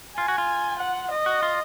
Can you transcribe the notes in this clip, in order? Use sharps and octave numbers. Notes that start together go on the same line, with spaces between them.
F4 G#5
F#4
F4
F#5
D#5
F#4
F4